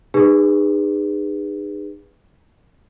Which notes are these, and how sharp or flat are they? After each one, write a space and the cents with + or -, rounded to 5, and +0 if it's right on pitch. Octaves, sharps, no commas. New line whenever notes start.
D#4 -30 G#4 -35 B4 -5